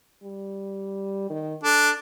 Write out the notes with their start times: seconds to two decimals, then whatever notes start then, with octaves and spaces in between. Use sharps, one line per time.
0.23 G3
1.30 D#3
1.64 D4 A4